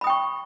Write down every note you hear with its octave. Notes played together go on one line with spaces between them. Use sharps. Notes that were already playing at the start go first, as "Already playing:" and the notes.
G5 B5 C#6 D#6